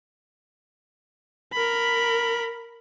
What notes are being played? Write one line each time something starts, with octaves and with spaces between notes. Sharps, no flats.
A#4 B5